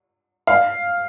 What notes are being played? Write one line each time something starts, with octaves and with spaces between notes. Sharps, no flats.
F5